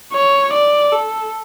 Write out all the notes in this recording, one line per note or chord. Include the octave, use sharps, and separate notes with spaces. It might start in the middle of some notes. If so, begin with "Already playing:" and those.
C#5
D5
A4